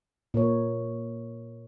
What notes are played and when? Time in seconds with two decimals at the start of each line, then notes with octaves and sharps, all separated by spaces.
0.34 A#2 A#4 C#5